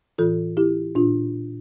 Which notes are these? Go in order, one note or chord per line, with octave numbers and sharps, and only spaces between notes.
A2 E3 F4 A4
E4 G4
A#2 D4 F4